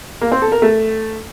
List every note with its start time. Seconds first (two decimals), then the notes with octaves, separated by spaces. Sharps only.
0.21 A#3
0.32 C4
0.42 A4
0.52 A#4
0.62 A3